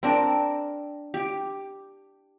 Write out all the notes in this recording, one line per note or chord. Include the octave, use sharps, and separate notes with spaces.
C4 D4 A#4
G4